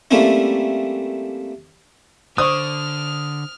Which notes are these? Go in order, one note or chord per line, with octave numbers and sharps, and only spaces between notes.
G3 A3 A#3 C4 C#4 E4
D3 C5 D5 C#6 D#6 F6